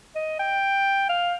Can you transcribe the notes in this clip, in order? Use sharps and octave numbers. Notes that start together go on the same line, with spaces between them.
D#5
G5
F5